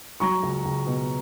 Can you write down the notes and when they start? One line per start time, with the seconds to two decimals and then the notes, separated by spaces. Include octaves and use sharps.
0.20 F#3 A#5 C#6
0.43 C#2
0.65 C#2
0.86 B2